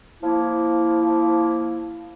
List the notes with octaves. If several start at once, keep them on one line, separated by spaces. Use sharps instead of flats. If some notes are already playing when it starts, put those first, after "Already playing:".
F3 A#3 E4